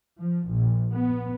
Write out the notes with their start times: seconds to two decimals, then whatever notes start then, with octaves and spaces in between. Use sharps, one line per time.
0.20 F3
0.51 A#1
0.93 B3